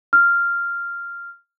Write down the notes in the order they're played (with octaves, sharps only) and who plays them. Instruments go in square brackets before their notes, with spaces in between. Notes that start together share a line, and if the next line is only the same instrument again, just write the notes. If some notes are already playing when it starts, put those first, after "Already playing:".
[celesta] F6